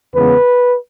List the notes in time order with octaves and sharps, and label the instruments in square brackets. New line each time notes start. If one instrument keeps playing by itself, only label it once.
[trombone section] E2 C#3 G#3 B3 B4